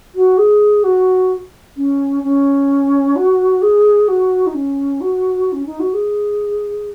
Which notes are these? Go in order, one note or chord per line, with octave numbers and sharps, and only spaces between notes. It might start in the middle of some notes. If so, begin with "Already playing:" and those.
F#4
G#4
F#4
C#4
C#4
F#4
G#4
F#4
D#4
C#4
F#4
C#4
D#4
F#4
G#4